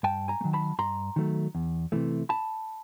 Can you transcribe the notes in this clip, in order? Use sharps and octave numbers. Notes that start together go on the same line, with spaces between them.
G2 G5 A5
G#5 A#5
A3
D#3 F#3
A5 B5
G2 A#5 C6
D#3 F#3 A3
E2
C3 E3 A3
A5 B5